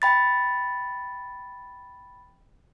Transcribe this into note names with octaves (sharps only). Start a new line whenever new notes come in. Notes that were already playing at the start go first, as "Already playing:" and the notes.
G5 B5 A6